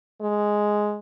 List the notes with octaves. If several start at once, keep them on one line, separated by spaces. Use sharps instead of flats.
G#3